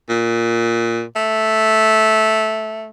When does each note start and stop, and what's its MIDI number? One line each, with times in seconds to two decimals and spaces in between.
0.09 1.03 46
1.16 2.89 57